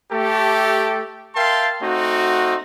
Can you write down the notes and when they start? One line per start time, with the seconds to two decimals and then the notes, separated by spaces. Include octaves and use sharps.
0.12 A3 G4 A4
1.36 A#4 E5 F5 G5 A5 C6
1.82 A3 C4 D#4 F#4